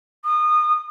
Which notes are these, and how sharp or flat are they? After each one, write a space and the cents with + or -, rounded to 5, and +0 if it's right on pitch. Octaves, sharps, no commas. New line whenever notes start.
D#6 -30